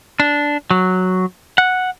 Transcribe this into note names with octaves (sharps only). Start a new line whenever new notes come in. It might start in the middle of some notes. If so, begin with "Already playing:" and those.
D4
F#3
F#5